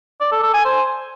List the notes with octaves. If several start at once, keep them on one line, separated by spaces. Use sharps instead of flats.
D5
A4
A4
G#5
C5